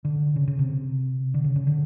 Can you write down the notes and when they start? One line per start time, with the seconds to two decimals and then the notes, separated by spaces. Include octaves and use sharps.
0.05 D3
0.36 C#3
0.48 C#3
0.59 C3
1.34 D3
1.44 C#3
1.56 C#3
1.67 D3